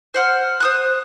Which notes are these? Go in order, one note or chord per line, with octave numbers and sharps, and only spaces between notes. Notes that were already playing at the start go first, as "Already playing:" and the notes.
C5 F#5 F6
C5 D#6 F#6